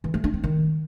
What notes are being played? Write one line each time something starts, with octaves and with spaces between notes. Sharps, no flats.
E3
A3
D4
C4
D#3